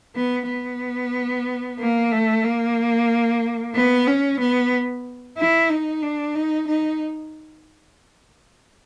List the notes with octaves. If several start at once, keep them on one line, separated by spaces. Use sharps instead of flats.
B3
B3
A#3
A3
A#3
B3
C#4
B3
E4
D#4
D4
D#4
D#4